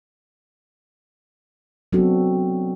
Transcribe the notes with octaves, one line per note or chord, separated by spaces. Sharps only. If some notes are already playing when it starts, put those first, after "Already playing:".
F#3 B3 C4 D4 F#4 A4